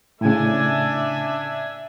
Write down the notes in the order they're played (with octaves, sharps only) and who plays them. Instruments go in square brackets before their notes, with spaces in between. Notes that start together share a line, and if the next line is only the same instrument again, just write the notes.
[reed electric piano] A2 C#3 [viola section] D4 E5 G#5